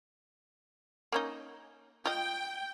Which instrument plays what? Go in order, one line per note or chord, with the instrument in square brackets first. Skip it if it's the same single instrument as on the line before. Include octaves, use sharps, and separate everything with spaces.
[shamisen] A#3 C#4 D#4
[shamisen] F4 D#5 [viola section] G5